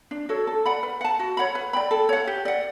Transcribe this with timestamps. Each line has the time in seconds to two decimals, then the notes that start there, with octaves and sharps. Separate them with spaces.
0.11 D4
0.29 F#4 A4 C#5
0.47 A4
0.66 D5 F#5 B5
0.83 B4
1.01 F#5 A5
1.19 F#4
1.37 C#5 F#5 B5
1.55 B4
1.73 D5 G5 B5
1.91 A4
2.09 C#5 F#5
2.27 G4
2.45 D5 F#5